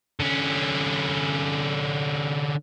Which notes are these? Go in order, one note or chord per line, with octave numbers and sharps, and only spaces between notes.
D3 C#4